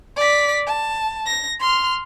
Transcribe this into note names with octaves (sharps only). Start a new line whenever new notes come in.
D5 B6
A5
A#6
C6 F6